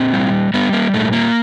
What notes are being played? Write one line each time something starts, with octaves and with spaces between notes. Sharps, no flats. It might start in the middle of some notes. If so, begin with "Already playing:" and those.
Already playing: A#2 C4
G3
G3 B3
A#3
A#2 A3
A#3